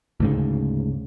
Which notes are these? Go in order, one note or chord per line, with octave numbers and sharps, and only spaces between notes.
D2 G#2 C#3